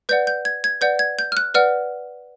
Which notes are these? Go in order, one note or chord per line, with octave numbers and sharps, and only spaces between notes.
B4 D5 F#5 G6
G6
G#6
G#6
B4 D5 F#5 G6
G#6
G6
F6
F#6
B4 D5 F#5 F6